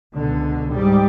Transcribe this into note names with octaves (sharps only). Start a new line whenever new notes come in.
C#2 B2 D3
G#2 G3